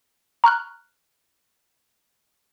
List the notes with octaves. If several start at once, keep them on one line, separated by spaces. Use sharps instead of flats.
A#5 C#6 F6 F#6